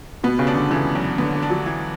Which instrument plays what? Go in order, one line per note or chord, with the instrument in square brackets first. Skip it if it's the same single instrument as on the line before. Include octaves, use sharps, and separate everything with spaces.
[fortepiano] B2 [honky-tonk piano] B3
[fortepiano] C#3
[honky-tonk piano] D4
[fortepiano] D3
[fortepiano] C#3 [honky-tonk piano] E3
[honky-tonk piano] F#2
[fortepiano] D3 [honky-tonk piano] B3
[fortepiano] D3
[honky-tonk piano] D4
[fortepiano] F#3
[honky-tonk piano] E3